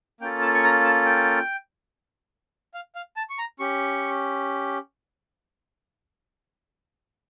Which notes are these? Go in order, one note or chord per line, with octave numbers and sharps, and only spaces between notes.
A#3 C#4 F4 A4 G5
A5
C#6
A#5
A5
G5
F5
F5
A5
C#6
A#5
C#4 G4 C#6